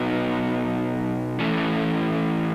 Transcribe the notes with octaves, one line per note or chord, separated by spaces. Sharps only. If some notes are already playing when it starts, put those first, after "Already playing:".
Already playing: B2 F#3 B3 D#4
E3 A3 C#4